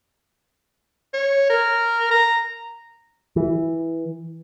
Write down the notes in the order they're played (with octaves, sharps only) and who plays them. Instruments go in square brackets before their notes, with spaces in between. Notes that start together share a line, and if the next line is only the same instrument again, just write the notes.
[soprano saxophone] C#5
A#4
A#5
[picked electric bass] E3